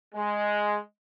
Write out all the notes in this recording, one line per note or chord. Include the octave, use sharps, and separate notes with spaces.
G#3